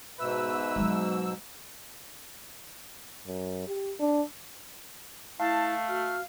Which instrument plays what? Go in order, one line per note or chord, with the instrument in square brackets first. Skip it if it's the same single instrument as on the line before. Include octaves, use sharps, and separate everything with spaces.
[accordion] G#2 B2 E6 [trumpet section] B4 E5
[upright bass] F#3 G#3
[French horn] F#2
G4
D4
[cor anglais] A3 [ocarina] E4 [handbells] F5 [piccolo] A5
[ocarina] F#4 [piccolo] F6